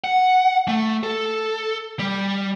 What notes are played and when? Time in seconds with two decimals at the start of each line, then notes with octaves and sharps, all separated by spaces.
0.04 F#5
0.68 A3
1.03 A4
1.99 G3